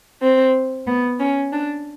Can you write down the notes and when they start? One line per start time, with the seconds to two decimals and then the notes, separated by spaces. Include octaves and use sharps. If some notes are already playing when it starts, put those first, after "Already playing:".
0.22 C4
0.87 B3
1.20 C#4
1.52 D4